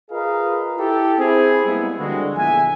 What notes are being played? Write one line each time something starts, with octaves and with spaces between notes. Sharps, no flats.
F4 G#4 A#4 B4 D#5 F5
E4 G4 A4
C4 E4 G#4
G3 G#3 A#3 B3 E4
D3 F3 G3 G#3 A#3 F#4
A#1 E2 D3 E5 G#5